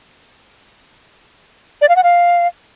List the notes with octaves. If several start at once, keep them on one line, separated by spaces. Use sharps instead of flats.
D5
F5
F#5
F5